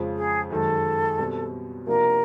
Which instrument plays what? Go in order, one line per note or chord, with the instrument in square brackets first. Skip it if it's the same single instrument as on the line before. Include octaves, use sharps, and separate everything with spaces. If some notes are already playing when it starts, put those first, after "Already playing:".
Already playing: [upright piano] F2 C#3 F3 G#3
[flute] G#4
[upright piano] F#2 D#3 G#3 [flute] A4
[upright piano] B2 G3 C4
[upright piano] C3 F3 A#3 D4 F#4 [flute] A#4